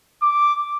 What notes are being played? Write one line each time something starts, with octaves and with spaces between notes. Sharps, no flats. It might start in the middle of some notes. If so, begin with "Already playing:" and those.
D6